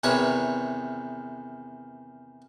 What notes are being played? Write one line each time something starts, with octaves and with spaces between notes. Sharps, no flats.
E2 C3 D#3 B4 C#5 A#5